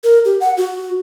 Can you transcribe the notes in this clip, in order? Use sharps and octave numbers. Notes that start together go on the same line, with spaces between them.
A#4
G4
F#5
F#4